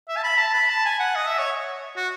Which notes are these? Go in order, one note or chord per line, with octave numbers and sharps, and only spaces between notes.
E5
A5
B5
A5
B5
A5
G#5
F#5
D#5
E5
C#5
F#4